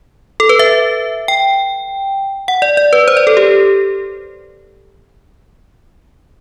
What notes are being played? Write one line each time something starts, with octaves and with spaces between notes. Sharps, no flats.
A4
B4
E5
G5
F#5
D5
D5
B4
C5
D5
A4
G4